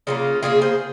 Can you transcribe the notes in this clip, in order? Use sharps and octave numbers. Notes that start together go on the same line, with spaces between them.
C#3 F#3 A#3 C#4 F4
C#3 F#3 A#3 F4 G#4
G#4 C5